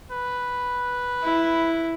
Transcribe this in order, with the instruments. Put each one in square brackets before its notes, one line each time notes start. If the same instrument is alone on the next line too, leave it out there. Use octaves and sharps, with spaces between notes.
[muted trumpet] B4
[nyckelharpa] E4